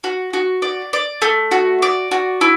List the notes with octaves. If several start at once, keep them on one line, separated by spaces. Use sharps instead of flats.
F#4
F#4
D5
D5
A3
F#4
D5
F#4
E4